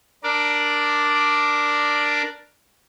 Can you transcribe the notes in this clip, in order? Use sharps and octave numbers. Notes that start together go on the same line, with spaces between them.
D4 A#4 D5